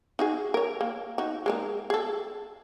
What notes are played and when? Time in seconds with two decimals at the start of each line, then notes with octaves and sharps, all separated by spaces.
0.19 D#4 F#4 G#4
0.54 A#4 C#5
0.81 A#3
1.18 D#4 F#4
1.46 G#3 A#3 D#4
1.90 G#4 A4